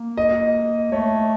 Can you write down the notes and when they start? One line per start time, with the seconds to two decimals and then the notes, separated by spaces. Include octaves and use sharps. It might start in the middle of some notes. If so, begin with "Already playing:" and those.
Already playing: A#3
0.17 D#5
0.92 A3 C#5